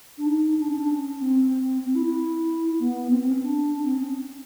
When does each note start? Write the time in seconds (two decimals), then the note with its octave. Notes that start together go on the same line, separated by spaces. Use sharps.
0.18 D4
0.26 D#4
0.58 D4
0.68 C#4
0.78 D4
0.90 C#4
1.21 C4
1.85 C4
1.95 E4
2.05 E4
2.79 B3
3.10 C4
3.20 C4
3.31 C#4
3.42 D4
3.73 D4
3.84 C4
3.94 C#4